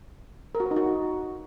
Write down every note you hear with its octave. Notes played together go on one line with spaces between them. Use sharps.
A#4
F#4
B4
D#4
F#4